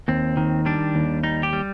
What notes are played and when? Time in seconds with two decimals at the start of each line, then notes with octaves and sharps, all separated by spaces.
0.08 D#2 C4
0.37 D#3
0.66 G3 D4
0.95 D#2
1.23 G3 D#4
1.43 G4
1.53 G3